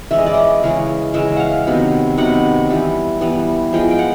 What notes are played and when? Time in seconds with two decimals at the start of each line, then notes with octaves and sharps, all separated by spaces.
0.11 E3 G#3 C#4 E4 E5
0.18 D#5
0.26 D5
0.34 D#5
0.63 C#3 E3 G#3 C#4
1.14 C#3 E3 G#3 C#4 E5
1.37 F5 F#5
1.67 C3 D#3 F#3 B3
2.17 C3 D#3 F#3 B3 F#5
2.69 E3 G3 B3
3.21 E3 G3 B3
3.73 F3 G#3 B3 G5
3.90 G5
3.99 F#5